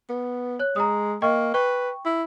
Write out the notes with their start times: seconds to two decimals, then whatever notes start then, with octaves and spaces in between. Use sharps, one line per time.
0.09 B3
0.59 C#5 F#6
0.76 G#3 A#5 D#6
1.22 A#3 D#5 G5 C#6
1.54 B4 G5 C#6
2.05 E4